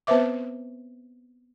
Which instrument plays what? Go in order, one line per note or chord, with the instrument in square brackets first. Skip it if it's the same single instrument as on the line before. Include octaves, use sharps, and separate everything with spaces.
[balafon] B3 C4 B4 C5 E5 D6